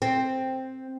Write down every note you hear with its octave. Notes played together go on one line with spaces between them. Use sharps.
C4